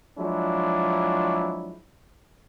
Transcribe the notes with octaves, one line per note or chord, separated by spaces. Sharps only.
F3 F#3 G#3 D4 E4